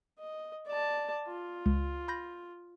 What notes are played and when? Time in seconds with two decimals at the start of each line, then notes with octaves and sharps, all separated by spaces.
0.19 D#5
0.67 D5 A5
1.28 F4
1.66 C#2
2.08 B5 G6 A#6